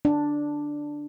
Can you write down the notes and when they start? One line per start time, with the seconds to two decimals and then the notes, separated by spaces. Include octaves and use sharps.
0.05 D4